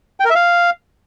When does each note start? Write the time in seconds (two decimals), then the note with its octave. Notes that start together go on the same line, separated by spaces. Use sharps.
0.20 G5
0.25 A#4
0.30 E5
0.35 F5